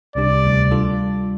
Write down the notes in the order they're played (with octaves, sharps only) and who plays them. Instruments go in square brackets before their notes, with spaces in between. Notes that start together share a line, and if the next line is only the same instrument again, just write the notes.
[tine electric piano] C2 C3 G3 D4 G4 [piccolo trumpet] D5
[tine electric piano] D2 C3 G3 D4
G3 D4 F4 A4